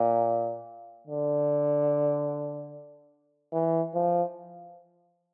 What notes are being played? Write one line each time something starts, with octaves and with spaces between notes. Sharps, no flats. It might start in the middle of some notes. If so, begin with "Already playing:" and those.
Already playing: A#2
D3
E3
F3